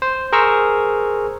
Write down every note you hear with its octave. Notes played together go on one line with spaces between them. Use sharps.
C5
G#4 A#4 C5 A#5 C#6 E6